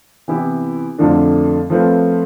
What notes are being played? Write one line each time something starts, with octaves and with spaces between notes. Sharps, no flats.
C3 E3 B3 E4 G4
F2 D3 F3 A3 D4
F3 A3 C4 F4 B4